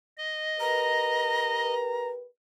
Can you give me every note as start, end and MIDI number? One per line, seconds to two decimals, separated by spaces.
0.18 1.74 75
0.60 2.25 67
0.60 2.25 70
0.60 2.25 71
0.60 2.08 82